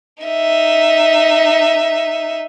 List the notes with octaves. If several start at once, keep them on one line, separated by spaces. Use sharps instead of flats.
D#4 E5